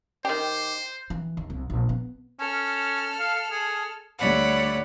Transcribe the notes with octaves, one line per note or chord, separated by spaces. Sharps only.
D#3 G4 C5
E3
D#2
C2
A#1
B3
C#4 A4 F6
F5
G#4
D2 G3 C#5 D5 F#5 B5